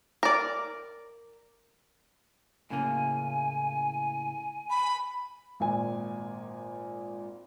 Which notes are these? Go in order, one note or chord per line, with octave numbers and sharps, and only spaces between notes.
A#4 D5
A2 C#3 A#3 G#5
B5
G#1 A#2 G#5